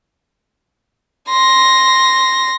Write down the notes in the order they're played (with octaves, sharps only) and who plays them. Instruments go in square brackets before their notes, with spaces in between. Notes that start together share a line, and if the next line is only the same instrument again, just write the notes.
[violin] C6 A#6